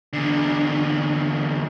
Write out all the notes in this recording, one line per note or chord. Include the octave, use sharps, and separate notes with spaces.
E2 D3